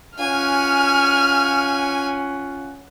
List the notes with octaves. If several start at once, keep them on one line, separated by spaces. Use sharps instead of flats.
C#4 F4 F#5 G#5 F6